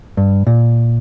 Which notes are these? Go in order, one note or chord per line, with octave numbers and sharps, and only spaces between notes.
G2
A#2